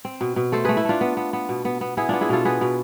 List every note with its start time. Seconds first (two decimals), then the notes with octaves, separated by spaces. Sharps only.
0.05 C4
0.21 B2
0.36 B2
0.52 A3 A4 C5
0.64 A3 G#4 B4
0.77 E4
0.85 A3 D4 F4
1.01 B3
1.17 B3
1.33 B3
1.49 B2
1.65 B3
1.81 B3
1.97 B3 E4 G#4
2.09 B3 D4 F4
2.21 E4 G#4
2.29 B2 F4 A4
2.45 B3 G#4 B4
2.61 B2